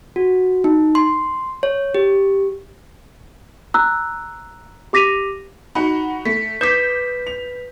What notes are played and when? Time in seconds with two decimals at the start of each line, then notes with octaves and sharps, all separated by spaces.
0.16 F#4
0.64 D#4
0.95 C6
1.63 C#5
1.94 G4
3.74 A#5 E6 F#6
4.93 G4 D6 A#6 B6 D#7 F7
5.75 D#4 F#4 F#5 B5
6.25 A3 B6
6.61 B4 D6 D#6 G6 B6
7.27 F7